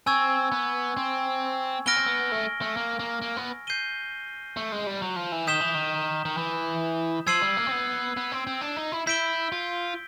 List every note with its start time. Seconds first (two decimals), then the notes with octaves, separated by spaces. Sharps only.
0.06 C4 G#5 C#6 E6 G#6
0.52 B3
0.97 C4
1.86 B3 F6 A#6 D7 G7
1.96 C4
2.06 B3
2.32 A3
2.61 A3
2.77 A#3
2.99 A#3
3.22 A#3
3.37 B3
3.67 G6 C7 D#7 G7
4.57 A3
4.72 G#3
4.87 G3
5.02 F#3
5.16 F3
5.32 E3
5.47 D#3 D#6 G6 B6 E7 G7
5.60 E3
5.75 D#3
6.25 D#3
6.37 E3
7.27 F3 E6 G#6 C7 D#7 F#7
7.42 G3
7.57 A#3
7.67 C4
7.71 B3
8.17 B3
8.32 C4
8.47 C4
8.61 D4
8.77 D#4
8.92 E4
9.07 E4 G6 B6 D7 G7
9.52 F4